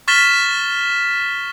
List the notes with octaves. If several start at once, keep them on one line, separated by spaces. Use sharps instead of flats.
C#6 F6 A6 B6 E7 G7